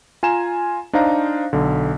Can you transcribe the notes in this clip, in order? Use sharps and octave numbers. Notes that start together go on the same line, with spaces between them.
F4 G#5 A#5 E7
D4 D#4 C5 F5 A#5
B1 D3